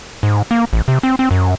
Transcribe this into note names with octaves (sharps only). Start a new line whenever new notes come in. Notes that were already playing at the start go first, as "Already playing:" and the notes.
G#2
A#3
A1
C3
C4
C4
F#2